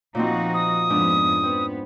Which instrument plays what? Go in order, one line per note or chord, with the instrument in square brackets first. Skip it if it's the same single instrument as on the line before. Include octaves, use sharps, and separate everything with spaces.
[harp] A#2 A#3 C4 [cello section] F3 D#4 F#4
[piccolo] D#6
[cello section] F2 B3 [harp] G#2 D4
[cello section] B3 [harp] C4